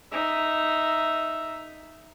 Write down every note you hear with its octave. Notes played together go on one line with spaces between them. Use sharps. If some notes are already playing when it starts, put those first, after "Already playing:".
D#4 E5